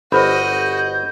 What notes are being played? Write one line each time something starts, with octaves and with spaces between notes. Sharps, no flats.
G1 F#4 C5 D#5 B5 G6